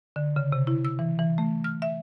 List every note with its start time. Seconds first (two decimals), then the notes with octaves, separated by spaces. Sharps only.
0.16 D3
0.36 C#3
0.52 C3
0.67 E4
0.85 E6
0.99 E3
1.19 E3
1.38 A3
1.64 F6
1.82 E5